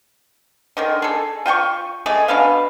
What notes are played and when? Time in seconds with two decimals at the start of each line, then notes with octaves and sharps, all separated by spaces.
0.77 D3 D#3 G#3
1.02 G#4 A4
1.46 F4 G5 G#5 C#6
2.06 G#3 A3 G#4
2.28 B2 D4 B4 F5